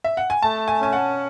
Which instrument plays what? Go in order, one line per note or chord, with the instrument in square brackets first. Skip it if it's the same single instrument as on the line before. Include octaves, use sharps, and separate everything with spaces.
[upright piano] E5
F#5
G#5
[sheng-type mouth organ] A3 [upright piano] A5
[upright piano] G#5
[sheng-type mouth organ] C#4 [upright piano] G#5
[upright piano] F#5